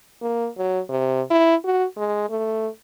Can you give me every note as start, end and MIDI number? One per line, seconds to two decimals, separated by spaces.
0.22 0.48 58
0.57 0.80 54
0.90 1.22 48
1.30 1.55 64
1.65 1.85 66
1.97 2.25 56
2.30 2.68 57